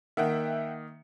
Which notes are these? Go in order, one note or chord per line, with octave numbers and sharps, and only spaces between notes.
D#3 A#3 E5 F#5 G5